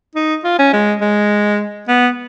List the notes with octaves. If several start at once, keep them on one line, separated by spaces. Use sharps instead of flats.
D#4
F4
C#4
G#3
G#3
B3